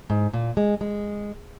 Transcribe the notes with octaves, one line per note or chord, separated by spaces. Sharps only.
G#2
A#2
G#3
G#3